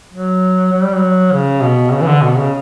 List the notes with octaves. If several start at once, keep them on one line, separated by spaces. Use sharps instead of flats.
F#3
F#3
G3
F#3
C#3
B2
C#3
E3
D3
B2
C#3